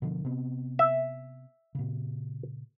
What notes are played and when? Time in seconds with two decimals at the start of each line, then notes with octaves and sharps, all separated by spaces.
0.02 B2 D3 F3
0.25 C3 B3
0.79 E5
1.75 A#2 C#3